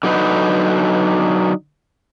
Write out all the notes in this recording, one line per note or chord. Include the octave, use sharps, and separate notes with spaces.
D3 F#3 D#4 B4